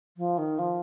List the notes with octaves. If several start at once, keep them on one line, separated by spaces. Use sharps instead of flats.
F3
D#3
F3